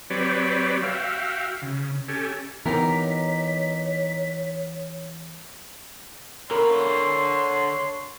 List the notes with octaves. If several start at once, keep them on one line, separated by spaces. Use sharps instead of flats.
F#3 C4 G4 B4 C#5 D5
F#4 E5 F5 G5
C#3
C#4 G4 A4 G#5
E3 B3 D#4 G4 A#4 C#5 B6
D3 A#4 C#5 B5 C6